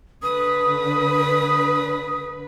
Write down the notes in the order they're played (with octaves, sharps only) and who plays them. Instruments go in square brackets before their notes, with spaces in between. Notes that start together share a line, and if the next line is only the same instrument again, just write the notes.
[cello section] D3 B4 [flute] D#6